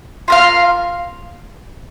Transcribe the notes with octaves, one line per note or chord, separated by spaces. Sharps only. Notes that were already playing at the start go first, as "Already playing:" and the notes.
F4 A#4 F5